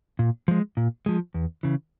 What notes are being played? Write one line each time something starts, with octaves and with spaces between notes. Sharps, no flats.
A#2
F3 G#3
A#2
F3 G#3
E2
C#3 E3